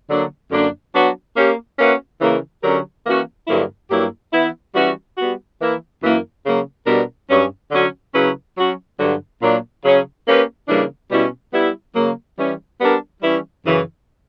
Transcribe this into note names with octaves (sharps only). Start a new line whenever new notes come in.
D3 F#3 A#3 D4
F#2 D3 A#3 D4
F#3 B3 D4 F#4
A#3 C#4 G4
A#3 C#4 F#4 B4 E5
C#3 E3 A#3
D3 F#3 C#4 G4 A#4
E3 A#3 C#4 F#4
G2 D3 F#3 A#3 E4
G2 F#3 A#3 E4 G4
E3 B3 E4
E3 G3 C#4 F#4
G3 B3 F#4
E3 A#3 E4
F#2 E3 A#3 E4
C#3 F#3 A#3
B2 G3 B3 D4 A#4
G2 F#3 C#4
D3 F#3 C#4 F#4
C#3 F#3 C#4 E4 B4
F#3 C#4 F#4
G2 D3 F#3
A#2 F#3 A#3 D4
C#3 F#3 C#4
A#3 C#4 G4 B4
C#3 E3 G3 A#3 D4
B2 G3 C#4 E4
G3 B3 E4
C#3 F#3 A#3
E3 G3 C#4
G3 B3 D4 A#4
E3 G3 C#4 E4
F#2 C#3 E3